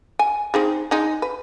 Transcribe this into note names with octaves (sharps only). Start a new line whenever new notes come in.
G#5
C4 D#4 G#4
G#3 D#4
B4